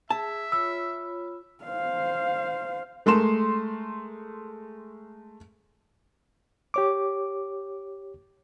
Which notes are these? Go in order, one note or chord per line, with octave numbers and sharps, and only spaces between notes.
G#4 E5 A5
F4 C#5 B5 E6
C5 F5
G#3 A3 A#4 C6 E7
G4 C#5 D6